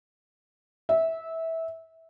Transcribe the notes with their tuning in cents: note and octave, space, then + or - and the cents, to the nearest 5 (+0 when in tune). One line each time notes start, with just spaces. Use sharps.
E5 -20